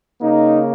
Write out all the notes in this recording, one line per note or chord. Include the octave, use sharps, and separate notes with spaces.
C#3 A#3 D#4